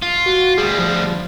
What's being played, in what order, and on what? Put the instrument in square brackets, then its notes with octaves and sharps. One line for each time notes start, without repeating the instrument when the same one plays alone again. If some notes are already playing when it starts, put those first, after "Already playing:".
[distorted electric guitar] F4
[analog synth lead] F#4
[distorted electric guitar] D2 G3 [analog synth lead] G#4
[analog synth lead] F3